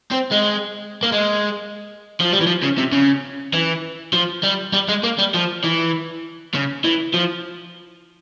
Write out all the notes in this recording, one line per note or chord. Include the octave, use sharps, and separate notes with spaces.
C4
G#3
A#3
G#3
F3
G3
E3
F3
C#3
C3
C#3
E3
F3
G3
G3
G#3
A#3
G3
F3
E3
C#3
E3
F3